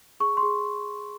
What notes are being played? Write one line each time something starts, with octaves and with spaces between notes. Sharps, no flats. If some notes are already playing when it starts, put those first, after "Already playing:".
G#4 C#6
C6
G#4